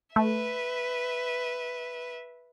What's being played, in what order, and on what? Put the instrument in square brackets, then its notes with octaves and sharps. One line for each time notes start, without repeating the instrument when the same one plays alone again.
[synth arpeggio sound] A3 [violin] B4 E5